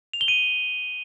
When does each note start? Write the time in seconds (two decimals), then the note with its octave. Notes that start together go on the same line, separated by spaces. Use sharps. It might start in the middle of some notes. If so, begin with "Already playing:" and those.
0.13 F7
0.21 G7
0.28 D#7